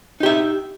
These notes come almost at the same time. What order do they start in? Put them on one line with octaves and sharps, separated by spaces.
D#4 G4 E5